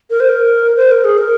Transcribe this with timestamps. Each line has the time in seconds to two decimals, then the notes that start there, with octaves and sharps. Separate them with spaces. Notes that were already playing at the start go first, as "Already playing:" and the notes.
0.10 A#4
0.20 C5
0.29 A#4
0.76 C5
0.91 A#4
1.04 G#4
1.18 A#4